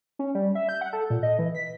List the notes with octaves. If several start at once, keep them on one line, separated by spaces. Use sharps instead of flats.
C#4
G3
E5
G6
F#5
A4
A#2
D#5
E3
B6